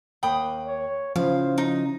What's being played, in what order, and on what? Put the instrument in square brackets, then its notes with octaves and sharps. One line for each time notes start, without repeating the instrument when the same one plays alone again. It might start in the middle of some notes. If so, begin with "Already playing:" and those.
[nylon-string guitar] D#2 A#3 [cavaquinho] G5 B5 D#6
[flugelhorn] C#5
[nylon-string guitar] C#3 E4 [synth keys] F3 [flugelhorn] C5 [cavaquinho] F5
[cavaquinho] D#4